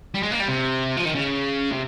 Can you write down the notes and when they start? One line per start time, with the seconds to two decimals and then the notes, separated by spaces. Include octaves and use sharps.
0.14 G3
0.23 G#3
0.31 A#3
0.40 G3
0.48 C3
0.97 F3
1.05 D#3
1.15 C#3
1.71 C3